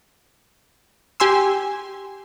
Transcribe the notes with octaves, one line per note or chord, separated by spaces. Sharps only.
G4 G#5 C6 E6